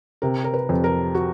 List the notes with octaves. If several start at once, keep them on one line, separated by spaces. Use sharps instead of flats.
C3 A#4
A#4
B4
F2
A#4
F#4